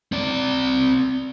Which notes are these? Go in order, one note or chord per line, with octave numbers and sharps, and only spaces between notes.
C4 D5